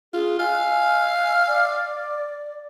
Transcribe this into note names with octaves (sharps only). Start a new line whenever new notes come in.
F4 G#4
F5 G#5
D5